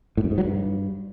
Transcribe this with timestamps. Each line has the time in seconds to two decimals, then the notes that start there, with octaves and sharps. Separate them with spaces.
0.17 A2
0.24 F#2
0.31 G#2
0.38 F#3
0.45 G2